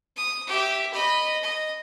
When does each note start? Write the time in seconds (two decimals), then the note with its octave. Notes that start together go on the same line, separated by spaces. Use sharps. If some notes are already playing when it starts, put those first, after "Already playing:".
0.17 D#6
0.47 G4 E5
0.93 D#5 B5
1.43 D#5